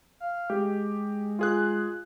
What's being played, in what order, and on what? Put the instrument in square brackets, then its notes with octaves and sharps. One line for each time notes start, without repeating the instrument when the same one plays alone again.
[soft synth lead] F5
[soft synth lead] G#3 [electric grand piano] G4
[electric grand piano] F4 G#4 F#6